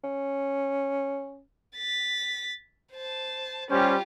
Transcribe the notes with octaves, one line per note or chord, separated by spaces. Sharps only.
C#4
A6 B6
C5 A5
G3 C#4 F4 G4 C5